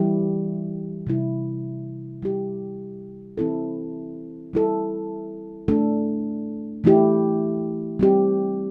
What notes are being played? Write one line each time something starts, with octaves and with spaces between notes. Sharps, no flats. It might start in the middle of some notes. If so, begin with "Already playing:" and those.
Already playing: E3 G3 E4 G4
C3 G3 E4
G3 E4 G4
E3 C4 E4 A4
G3 E4 A4
A3 D4 A4
E3 A3 E4 G4
G3 C4 G4